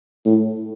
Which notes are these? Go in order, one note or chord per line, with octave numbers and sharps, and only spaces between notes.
A2